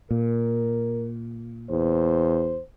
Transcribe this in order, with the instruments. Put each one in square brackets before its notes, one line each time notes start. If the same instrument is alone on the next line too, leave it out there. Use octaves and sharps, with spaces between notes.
[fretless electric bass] A#2 [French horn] A#4
[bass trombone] E2 [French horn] C5